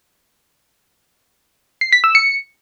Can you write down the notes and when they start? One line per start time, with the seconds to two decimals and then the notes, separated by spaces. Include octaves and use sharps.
1.81 C7
1.93 B6
2.04 E6
2.15 C#7